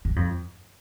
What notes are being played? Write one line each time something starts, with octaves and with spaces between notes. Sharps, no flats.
G2
F2